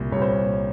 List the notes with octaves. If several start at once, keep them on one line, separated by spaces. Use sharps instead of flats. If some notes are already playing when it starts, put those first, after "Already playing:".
Already playing: C2 A#2
C2 A#2 C#5
C5